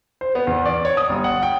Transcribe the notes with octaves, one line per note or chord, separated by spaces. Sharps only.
C5
B3
E2
D5
C#5
D#6
G1
F#5
G5